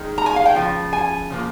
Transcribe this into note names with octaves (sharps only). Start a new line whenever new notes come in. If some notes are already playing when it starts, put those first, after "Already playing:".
Already playing: D#3 G#3
A#5
G#5
F5
G5
C#3 F3
G#5
C#3 F3 A#3